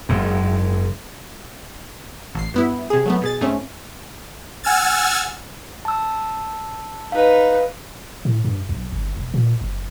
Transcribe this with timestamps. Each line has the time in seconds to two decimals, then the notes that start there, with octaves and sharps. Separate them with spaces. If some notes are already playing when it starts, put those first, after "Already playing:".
0.09 F#1 G#2
2.35 A1 C7
2.54 G2 B3 E4
2.90 C3 G#4
3.05 F#3 A3 B3
3.22 B2 G#4 A6
3.41 G#2 A3 C4 C#4
4.64 F#5 G#5 E6 F6 G#6 A6
5.85 A5 E6
7.12 D#4 B4 F5
8.25 A2
8.44 G2
8.69 B1
8.92 G1
9.17 E1
9.34 A#2
9.61 F#1